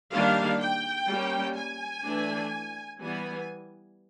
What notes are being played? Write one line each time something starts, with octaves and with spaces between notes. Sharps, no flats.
D#3 G3 A#3 D4 F5
G5
G3 A#3 C#4
G#5
E3 A3 D4
E3 G3 B3 G#5